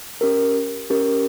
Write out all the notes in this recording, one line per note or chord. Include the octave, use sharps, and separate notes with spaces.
C#4 G4 A#4
C#4 G4 A#4